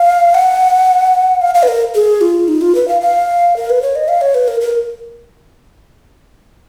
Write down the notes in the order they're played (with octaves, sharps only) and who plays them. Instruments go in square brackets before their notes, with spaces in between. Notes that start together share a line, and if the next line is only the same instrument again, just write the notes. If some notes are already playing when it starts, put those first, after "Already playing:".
Already playing: [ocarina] F5
F#5
F5
F5
B4
A#4
G#4
F4
D#4
F4
B4
F5
F5
A#4
B4
C#5
D#5
F5
C#5
B4
A#4
A#4